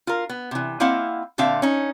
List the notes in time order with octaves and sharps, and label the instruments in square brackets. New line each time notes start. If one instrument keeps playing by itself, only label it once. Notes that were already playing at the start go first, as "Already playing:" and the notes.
[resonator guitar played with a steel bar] F4 A#4
B3
C3 E3
A#3 C4 E4 D#5 F5 F#5
A#2 D3 C4 E5 F5
C#4 D#4